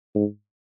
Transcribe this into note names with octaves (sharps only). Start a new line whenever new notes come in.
G#2